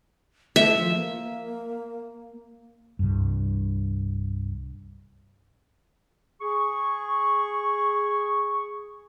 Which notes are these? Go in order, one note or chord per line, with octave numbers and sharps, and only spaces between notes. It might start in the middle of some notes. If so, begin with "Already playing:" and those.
A3 E5
F3
A#3
C2 G2
G#4 C#6